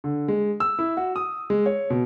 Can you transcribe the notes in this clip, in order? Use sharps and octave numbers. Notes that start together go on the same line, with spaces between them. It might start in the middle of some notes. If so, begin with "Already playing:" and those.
D3
G#3
E6
E4
F#4
D#6
G#3
C#5
B2